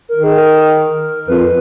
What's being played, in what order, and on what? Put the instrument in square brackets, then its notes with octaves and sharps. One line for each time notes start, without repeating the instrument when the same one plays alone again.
[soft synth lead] A#4
[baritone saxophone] D#3
[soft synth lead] G#4
A#4
[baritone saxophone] F2 [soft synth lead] B4